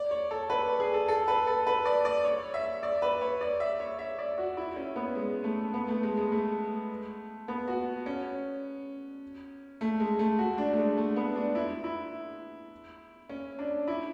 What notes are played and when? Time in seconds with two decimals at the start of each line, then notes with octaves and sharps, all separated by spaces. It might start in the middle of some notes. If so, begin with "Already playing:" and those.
Already playing: D5
0.11 C#5
0.31 A4
0.50 B4
0.80 G#4
0.94 A4
1.08 A4
1.28 B4
1.47 A4
1.67 B4
1.85 D5
2.05 D5
2.24 C#5
2.54 E5
2.83 D5
3.02 B4
3.21 C#5
3.41 D5
3.60 E5
3.80 C#5
3.99 E5
4.19 D5
4.38 F#4
4.57 E4
4.76 C#4
4.96 B3
5.15 G#3
5.44 A3
5.74 B3
5.88 A3
6.03 G#3
6.17 G#3
6.32 A3
7.48 B3
7.68 F#4
8.06 C#4
9.81 A3
10.00 G#3
10.19 A3
10.39 F#4
10.58 D4
10.73 A3
10.78 G#3
10.97 A3
11.16 B3
11.36 D4
11.55 E4
11.84 E4
13.29 C#4
13.59 D4
13.87 E4